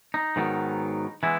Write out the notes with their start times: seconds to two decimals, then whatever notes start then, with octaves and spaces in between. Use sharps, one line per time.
0.14 D#4
0.36 G#2 D#3 F#3 B3
1.23 E3 G#3 B3 E4